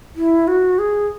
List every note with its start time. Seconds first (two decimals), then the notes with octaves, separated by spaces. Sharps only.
0.16 E4
0.48 F#4
0.79 G#4